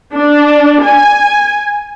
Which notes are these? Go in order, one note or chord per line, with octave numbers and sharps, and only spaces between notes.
D4
G#5